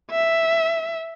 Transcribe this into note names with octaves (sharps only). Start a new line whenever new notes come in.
E5